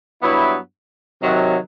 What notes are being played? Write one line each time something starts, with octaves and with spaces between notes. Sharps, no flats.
G2 F#3 B3 E4
C3 D#3 F#3